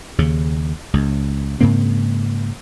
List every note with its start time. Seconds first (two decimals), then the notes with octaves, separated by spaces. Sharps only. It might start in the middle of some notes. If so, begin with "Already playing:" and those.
0.18 D#2 C#3
0.93 C#2
1.61 G#2 C#3 A#3 C4